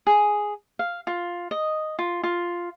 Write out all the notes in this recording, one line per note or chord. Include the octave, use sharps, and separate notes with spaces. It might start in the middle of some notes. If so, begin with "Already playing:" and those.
G#4
F5
F4
D#5
F4
F4